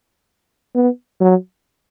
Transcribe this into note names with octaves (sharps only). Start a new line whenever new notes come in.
B3
F#3